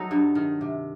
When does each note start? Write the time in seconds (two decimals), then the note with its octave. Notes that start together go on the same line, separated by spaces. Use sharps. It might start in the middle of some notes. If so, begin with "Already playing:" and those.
Already playing: F#3 D#4 A4
0.11 G2
0.35 D#3
0.61 C3